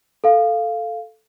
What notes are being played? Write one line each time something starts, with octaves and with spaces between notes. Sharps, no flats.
A4 F5